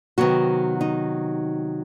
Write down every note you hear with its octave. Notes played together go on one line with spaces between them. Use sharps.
C3 D#3 F#3 B3 F#4
D#4